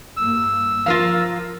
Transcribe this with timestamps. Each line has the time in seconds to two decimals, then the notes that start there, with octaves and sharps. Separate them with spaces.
0.17 G2 A#3 E6
0.86 F3 F4 A#4 F5